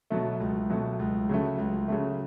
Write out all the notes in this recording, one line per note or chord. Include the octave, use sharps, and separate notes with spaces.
B2 F#3 A3
C#2
B2 F#3 A3
C#2
C#3 F#3 A3
C#2
C#3 F#3 A3